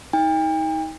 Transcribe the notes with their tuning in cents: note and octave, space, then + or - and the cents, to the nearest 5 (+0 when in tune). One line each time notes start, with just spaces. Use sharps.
D#4 +30 G5 +40